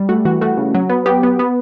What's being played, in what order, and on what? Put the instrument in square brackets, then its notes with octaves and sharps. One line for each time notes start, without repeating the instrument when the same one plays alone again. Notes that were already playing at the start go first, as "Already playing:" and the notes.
Already playing: [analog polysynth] G3
A3 F#4
E3 F#4
A3 F#4
C#3
F#3
B3
B3 G4
B3
B3